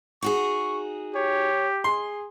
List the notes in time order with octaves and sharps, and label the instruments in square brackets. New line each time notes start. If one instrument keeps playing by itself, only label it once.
[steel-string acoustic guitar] D#4 F#4 G#4 [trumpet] C#6
[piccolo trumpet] G4 [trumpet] C#5
[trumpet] G#4 [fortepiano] C6